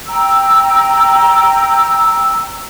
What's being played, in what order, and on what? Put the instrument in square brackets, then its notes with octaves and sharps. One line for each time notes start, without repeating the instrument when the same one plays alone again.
[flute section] G5 A#5 E6